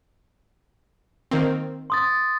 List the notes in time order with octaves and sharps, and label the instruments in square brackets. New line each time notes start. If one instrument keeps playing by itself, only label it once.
[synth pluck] D#3 A#3 C4
[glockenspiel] C6 D#6 A6